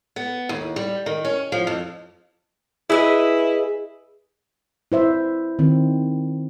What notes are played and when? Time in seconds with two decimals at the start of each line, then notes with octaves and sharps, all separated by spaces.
0.16 B3
0.49 D#2
0.76 G3
1.06 D#3
1.25 C#4
1.52 F3
1.67 F2
2.90 E4 G#4 B4 D#5
4.92 E4 C5 E5
5.59 D#3 C4